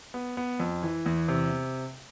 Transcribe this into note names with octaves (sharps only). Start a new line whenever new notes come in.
B3
B3
F2
E3
E2
C3